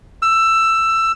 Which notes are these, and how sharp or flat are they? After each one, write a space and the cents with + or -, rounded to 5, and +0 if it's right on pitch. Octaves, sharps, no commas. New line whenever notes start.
E6 +15